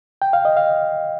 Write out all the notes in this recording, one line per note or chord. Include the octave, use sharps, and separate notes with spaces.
G5
F5
D#5
F5